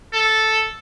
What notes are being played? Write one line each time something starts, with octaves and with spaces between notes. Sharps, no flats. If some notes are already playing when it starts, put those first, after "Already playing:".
A4